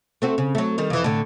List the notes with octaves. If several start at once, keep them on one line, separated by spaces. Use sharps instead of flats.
A3 C4 F#4
C#3
F#3 A3
D#3 G3
F2 E3
A2 D3